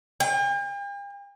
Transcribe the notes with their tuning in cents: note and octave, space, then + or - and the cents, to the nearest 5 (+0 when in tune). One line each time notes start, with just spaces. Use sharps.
G5 +45